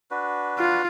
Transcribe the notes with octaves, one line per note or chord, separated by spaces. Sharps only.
D4 F#4 B4
F4